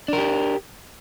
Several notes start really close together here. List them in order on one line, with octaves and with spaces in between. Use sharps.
D4 A#4 G4